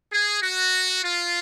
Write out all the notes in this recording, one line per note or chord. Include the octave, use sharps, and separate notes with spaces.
G#4
F#4
F4